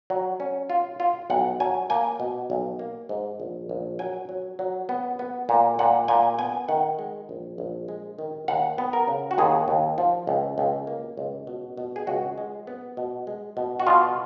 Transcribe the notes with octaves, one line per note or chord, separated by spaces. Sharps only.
F#3
C#4
F4
F4
B1 F#5
F#3 G#5
A#3 G#5
B2
B1
A#3
G#2
A#1
A#1
F#3 G#5
F#3
F#3
B3
B3
A#2
A#2 F#5
A#2 G#5
B3 G#5
D#3 F#5
G#3
A#1
A#1
G#3
D#3
D#2 F#5
B3
A#4
C#3
F#4
D#2 G#4
D#2
F3
C#2
C#2
A#3
C#2
B2
B2
G#4
C#2 F#4
G#3
B3
B2
G#3
B2
F#4
B2 F4